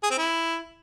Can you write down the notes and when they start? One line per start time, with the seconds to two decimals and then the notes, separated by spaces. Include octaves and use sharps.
0.03 G#4
0.11 C4
0.18 E4